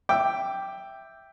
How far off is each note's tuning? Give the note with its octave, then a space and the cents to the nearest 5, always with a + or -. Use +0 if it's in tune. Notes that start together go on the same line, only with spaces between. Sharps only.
E5 +0 G5 +0 D6 +0